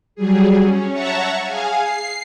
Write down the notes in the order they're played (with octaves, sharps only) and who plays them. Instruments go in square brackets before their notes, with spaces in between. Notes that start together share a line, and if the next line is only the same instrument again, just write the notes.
[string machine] F#3 G3 G#4
C#4
C#5 E5 F#5 A5 A#5 C#6
G#4 F5 G#5
C7